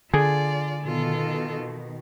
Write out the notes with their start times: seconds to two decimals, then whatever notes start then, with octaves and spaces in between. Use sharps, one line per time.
0.14 D3 F4 G#4 D5
0.83 B2 D#3 F4 A4